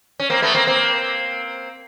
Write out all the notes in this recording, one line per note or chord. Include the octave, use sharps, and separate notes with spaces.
C#4
A#3 C4
A3 B3
A#3 C4
A#3 C4